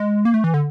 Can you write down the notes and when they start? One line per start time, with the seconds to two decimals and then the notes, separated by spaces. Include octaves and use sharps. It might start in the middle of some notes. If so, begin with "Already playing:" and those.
Already playing: G#3
0.25 A#3
0.34 A3
0.44 E3
0.54 D3